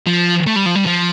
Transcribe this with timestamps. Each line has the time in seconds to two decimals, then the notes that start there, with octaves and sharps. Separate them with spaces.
0.07 F3
0.47 A3
0.56 G3
0.66 F3
0.75 G3
0.86 F3